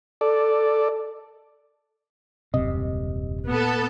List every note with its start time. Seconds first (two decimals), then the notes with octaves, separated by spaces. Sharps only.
0.21 A4 D5
2.54 D#1 C#2 F#2 C3 D#5
3.50 A#2 B3 A4